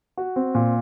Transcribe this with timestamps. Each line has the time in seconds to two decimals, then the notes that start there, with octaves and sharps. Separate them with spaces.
0.17 F#4
0.36 C4
0.55 A#2